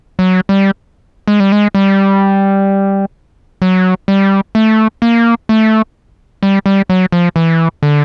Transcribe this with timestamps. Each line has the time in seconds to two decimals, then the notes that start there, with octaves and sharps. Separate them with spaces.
0.19 F#3
0.49 G3
1.28 G#3
1.40 G3
1.52 G#3
1.75 G3
3.62 F#3
4.08 G3
4.55 A3
5.02 A#3
5.49 A3
6.43 G3
6.66 G3
6.89 F#3
7.12 F3
7.36 E3
7.83 D3